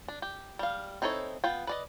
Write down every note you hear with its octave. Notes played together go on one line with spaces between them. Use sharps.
D4
G4
G3 F5
C4 D#4 E4 A4 C#5
B3 F4 G5
B4 D5 D#5